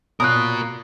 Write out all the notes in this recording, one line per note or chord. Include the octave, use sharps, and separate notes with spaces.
B2 F4 A#4 C#5 D#6 F#6